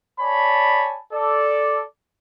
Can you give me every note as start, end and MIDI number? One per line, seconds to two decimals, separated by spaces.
0.21 0.98 73
0.21 0.98 74
0.21 0.98 80
0.21 0.98 81
0.21 0.98 83
1.13 1.81 69
1.13 1.81 74